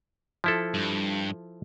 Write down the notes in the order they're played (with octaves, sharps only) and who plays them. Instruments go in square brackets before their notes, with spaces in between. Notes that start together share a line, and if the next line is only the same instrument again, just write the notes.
[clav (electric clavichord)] F3 E4 A4
[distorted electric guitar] G2